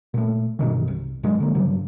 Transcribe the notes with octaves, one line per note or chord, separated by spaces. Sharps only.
A#2 A3
G2 B2 D#3 E3
C2
G#2 D#3 F#3 G#3
D3 A#3
G2 C#3 F#3